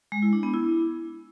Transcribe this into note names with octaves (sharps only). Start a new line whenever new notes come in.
G#3
E4
D4
B3
E4